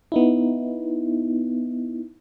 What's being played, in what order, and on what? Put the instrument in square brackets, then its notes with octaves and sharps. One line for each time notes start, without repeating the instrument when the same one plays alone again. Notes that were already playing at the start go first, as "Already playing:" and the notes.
[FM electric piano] B3 D#4 E4